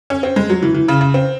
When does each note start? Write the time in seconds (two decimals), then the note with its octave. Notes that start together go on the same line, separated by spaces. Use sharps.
0.10 C#4
0.23 C4
0.36 G#3
0.50 F#3
0.63 E3
0.74 E3
0.88 C#3
1.01 C#3
1.14 C4